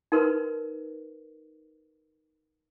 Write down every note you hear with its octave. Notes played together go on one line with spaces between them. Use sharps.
D#4 A#4 B4